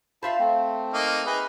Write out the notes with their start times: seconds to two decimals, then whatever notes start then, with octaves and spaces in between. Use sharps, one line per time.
0.23 F4 C5 E5 F5 A5 B5
0.39 A3 C4
0.94 A#3 D#4
1.26 D#4 G#4 B4